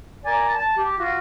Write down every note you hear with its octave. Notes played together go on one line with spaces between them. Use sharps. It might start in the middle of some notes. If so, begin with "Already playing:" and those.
A#4 D5 G#5
A5
G4
F4 F#4